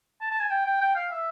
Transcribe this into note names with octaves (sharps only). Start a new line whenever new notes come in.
A5
A5
G#5
G5
G5
G5
F5
E5